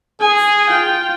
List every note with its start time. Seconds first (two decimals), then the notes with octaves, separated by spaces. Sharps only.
0.20 G#4 G#5
0.68 F4 G5